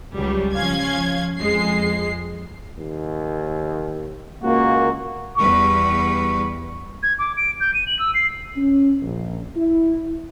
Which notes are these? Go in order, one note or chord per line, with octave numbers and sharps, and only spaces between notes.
C#2 F#3 G3
F3 C#4 F5 G#6
F2 G#3 C7
D#2
C#2 A#3 F#4
E2 G3 B4 C#6
G#6
D6
D7
G6
D#7
F#7
E6
C7
C#4
A#1
E4